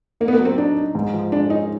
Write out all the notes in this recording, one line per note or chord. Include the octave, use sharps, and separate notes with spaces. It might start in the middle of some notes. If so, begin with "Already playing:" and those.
A#3 D#4
B3
A#3
F#3
C4
D4 D#4
D#4
G#2
F3
G#3 D4
C#4 D#4